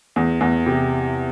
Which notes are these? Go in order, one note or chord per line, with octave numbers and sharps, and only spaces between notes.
E2
E2
C3